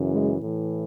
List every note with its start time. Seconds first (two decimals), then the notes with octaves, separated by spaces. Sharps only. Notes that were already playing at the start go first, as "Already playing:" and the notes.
Already playing: F#2 C#3 E3
0.10 G#3
0.40 A2 E3